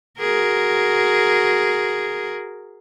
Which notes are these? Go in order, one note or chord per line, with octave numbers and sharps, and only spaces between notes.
F#4 G#4 A#4